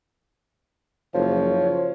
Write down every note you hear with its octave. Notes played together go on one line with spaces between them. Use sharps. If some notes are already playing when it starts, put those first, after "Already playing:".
F#1 F3 C#5